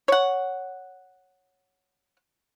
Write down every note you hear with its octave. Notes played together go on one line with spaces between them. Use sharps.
C#5 F#5